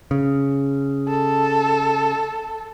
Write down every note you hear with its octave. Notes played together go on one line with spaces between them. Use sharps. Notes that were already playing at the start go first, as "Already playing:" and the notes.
C#3
A4